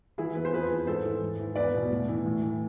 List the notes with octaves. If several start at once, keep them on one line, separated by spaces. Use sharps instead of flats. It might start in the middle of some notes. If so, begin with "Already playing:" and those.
E3 E4 G#4
E2 B4
C5
F2 G#4 B4
E3
G#2 A4 C5
E3
G#2
E3
E2 B4 D5
B2
A2
E3
A2
E3